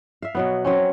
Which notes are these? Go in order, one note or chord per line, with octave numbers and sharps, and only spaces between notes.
E5 F5
B2 F#3 B3
F#3 C4 C#4